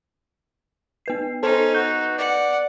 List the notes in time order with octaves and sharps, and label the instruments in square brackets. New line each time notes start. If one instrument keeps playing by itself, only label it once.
[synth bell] B3 B4 C7
[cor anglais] C#4 [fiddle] D#4 [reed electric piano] A4 C5
[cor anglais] F#4 [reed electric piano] G6
[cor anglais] D5 [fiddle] F#5